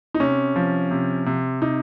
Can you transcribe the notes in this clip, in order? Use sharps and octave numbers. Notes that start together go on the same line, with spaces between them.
D#4
C3 C#4
F3
C3
C3
C3 D#4